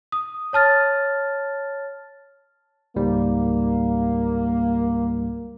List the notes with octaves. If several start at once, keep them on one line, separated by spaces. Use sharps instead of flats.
D#6
C#5 A5 F6 A6
C#2 G#2 G3 A#3